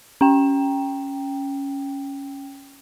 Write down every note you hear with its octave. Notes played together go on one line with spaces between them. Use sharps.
C#4 G5